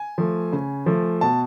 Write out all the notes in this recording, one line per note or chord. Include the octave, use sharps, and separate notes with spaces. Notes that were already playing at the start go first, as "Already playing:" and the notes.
Already playing: G#5
F3 A3
C#3
F3 A3
B2 A5